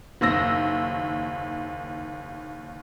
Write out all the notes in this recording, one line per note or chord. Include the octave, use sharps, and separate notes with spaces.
F#1 D#2 E6 A#6